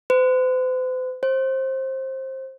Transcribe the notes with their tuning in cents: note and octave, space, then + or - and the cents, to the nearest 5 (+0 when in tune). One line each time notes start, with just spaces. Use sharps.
C5 -45
C5 +20